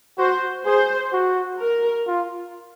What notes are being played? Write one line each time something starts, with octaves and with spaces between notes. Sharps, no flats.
F#4 C5
G#4 C5
F#4
A#4
F4